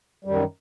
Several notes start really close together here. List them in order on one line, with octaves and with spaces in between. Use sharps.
G3 F#2 D#3